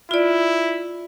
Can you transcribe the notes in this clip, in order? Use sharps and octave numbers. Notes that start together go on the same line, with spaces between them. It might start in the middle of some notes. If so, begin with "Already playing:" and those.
E4 F4 D5